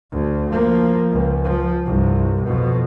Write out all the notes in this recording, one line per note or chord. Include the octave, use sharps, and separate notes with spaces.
D2
F3 A#3
C#2
F3
C2 G2
F2 B2